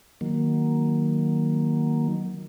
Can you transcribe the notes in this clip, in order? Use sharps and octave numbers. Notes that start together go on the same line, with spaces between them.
D#3 F#3 A#3